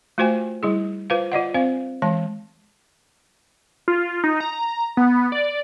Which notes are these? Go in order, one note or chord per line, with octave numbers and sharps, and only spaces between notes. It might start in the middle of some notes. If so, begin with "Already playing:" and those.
A3 F4 F#4 C5 G5 G#5
G3 E4 G#4
F4 B4 C5 F5
F4 D5 D#5 F#5
C4 C5 F5
E3 G#3 A5
F4
D#4
A#5
B3
D5